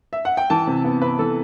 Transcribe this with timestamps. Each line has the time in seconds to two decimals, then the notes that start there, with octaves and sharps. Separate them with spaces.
0.13 E5
0.25 F#5
0.37 G5
0.50 E3 A5
0.67 C3
0.84 B3
1.02 C3 B4
1.19 E3 A4